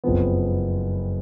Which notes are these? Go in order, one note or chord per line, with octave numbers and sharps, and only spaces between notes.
F#1 F2 F3 B3